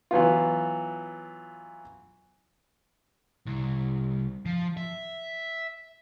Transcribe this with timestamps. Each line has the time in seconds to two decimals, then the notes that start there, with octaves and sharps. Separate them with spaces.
0.11 E3 F#3 B3 F4
3.46 C2
4.46 F3
4.77 E5